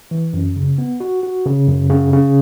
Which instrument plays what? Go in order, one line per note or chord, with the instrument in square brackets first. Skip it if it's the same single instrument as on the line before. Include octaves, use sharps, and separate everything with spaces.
[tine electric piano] E3
F#2
C#3
B3
F#4
F#4
C#3
F#2
C#3
C#3